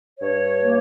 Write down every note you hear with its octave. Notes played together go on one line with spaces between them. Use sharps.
G2 C#5
A#3